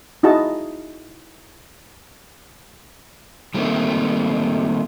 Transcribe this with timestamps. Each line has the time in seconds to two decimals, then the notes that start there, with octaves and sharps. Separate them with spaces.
0.23 D#4 E4 F#4 G#4 D#5 A5
3.54 D#3 G3 A3 A#3 C4